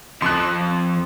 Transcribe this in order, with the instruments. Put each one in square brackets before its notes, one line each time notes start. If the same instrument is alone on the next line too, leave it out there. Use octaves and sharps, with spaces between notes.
[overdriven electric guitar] F2 F3 [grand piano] C6 F#6